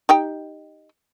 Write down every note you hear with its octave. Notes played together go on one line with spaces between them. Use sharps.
D#4 G4 G5